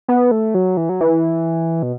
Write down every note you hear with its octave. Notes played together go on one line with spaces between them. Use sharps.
B3
A3
F#3
E3
F#3
E3
B2